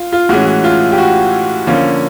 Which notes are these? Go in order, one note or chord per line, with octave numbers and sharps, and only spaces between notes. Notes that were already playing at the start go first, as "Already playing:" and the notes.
Already playing: F4
F4
A2 E3 G#3 C#4 F#4
F#4
F4
G4
F#4
D3 F3 A#3 C#4